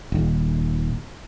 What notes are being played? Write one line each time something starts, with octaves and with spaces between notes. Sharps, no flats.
D#1